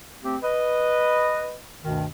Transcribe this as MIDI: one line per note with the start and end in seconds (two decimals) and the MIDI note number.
0.24 0.36 57
0.24 0.36 60
0.24 0.36 67
0.43 1.56 71
0.43 1.56 75
1.84 2.05 38
1.84 2.05 43
1.84 2.05 47
1.84 2.05 51